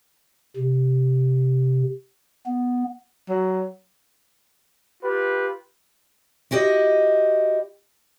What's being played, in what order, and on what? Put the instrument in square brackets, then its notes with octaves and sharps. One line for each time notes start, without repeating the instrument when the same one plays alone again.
[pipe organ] C3
B3
[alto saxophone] F#3
[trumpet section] F4 G4 B4
[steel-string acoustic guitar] E4 F#4 G4 C5 D#5